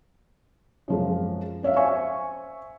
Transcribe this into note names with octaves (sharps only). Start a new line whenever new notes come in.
F#2 F3 G#3
C#4 C#5 E5 F5
C5 E5 G#5 C#6